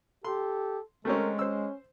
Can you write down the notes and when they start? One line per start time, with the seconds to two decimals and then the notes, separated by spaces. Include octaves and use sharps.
0.24 G4 A4 C6
1.05 G#3 A3 C4 C#4 A#4
1.39 C#4 C5 E6